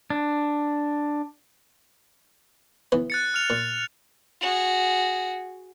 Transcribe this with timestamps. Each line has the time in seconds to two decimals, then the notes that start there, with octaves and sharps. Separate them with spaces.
0.10 D4
2.92 E3 B3
3.10 F#6 A6 C#7
3.34 F6 F7
3.50 A#2
4.41 F#4 G#4